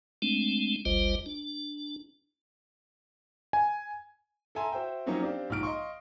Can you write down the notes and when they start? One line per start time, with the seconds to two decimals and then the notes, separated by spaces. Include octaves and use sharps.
0.22 G#3 A3 C4 D4
0.85 G#1 D2 G3 F4 C5 D#5
1.26 D4
3.53 G#5
4.55 A4 E5 G#5 A#5 C6
4.72 F#4 C5 E5 G5
5.06 F3 F#3 A#3 C4 C#4 D#4
5.21 C4 D4 G4 D5 F5
5.50 A#1 G#2 F6 D7
5.63 D#5 F5 C6 C#6